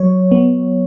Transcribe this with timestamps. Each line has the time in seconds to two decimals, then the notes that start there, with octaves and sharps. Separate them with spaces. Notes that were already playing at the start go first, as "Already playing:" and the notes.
Already playing: F#3 C#5
0.32 B3